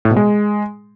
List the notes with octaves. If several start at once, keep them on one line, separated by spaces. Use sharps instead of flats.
A2
B2
G#3